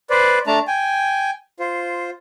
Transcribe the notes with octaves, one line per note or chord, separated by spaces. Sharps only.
B4 C5 D5
A3 D4 A5 A#5
G5 G#5
F4 C5